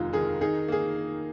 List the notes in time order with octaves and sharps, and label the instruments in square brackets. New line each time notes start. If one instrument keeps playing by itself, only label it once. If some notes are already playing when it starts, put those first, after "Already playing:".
Already playing: [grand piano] F1 D#2 D#3 G#3 [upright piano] D#4 F4
[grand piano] D#3 [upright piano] G#4
[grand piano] D#4 [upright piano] G#4
[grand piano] A#3 [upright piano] G#4